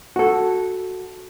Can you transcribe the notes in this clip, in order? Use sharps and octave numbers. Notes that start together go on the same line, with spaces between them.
F#4 A4